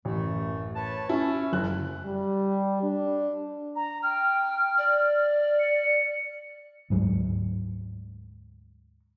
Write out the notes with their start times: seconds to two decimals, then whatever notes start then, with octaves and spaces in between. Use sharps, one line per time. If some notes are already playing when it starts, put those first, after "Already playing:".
0.05 A1 F#2 A3
0.75 B4 C#5 A5
1.09 C#4 E4
1.53 F#1 F#6
2.05 G3
2.83 D4
3.76 A#5
4.03 G5 F6
4.78 D5
5.60 C#7
6.90 D2 G#2 F#3 G#3